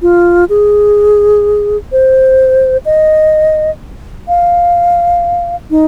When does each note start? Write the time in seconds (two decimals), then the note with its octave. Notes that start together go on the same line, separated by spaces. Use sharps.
0.02 F4
0.49 G#4
1.92 C5
2.86 D#5
4.28 F5
5.71 D#4